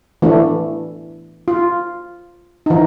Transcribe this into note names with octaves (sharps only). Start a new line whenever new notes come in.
E3 A3 D4
F4
E3 D#4